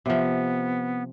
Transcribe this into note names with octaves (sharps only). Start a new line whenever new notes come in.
C3 F3 B3